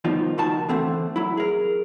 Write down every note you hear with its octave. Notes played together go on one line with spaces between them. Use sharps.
D#3 F3 G3 B3 D#4 F4
C#2 D#3 F#4 A5
D3 E3 A3 C4 F#5
F#3 E4
G#4 A#4